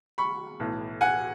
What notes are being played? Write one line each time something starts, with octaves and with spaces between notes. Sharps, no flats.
B5 C#6
B1 A2 E3
F#5 G#5